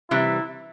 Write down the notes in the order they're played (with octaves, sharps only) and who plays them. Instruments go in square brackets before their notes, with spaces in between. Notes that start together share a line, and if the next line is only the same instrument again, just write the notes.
[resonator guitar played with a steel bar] C3 E3 G3 [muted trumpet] E4